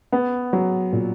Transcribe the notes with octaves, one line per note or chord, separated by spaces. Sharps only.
B3
F#3
A#2